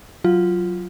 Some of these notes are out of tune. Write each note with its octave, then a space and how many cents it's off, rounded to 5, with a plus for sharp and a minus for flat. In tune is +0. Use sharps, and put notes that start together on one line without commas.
F#3 +0 F4 +0